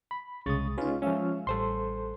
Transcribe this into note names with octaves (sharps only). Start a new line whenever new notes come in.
B5
C2 C#3 G#3 C#6 D#6 A6
G#3 C#4 D#4 F4 B4
F3 G#3 C#4 E5 F5
A1 G3 A4 C5 C6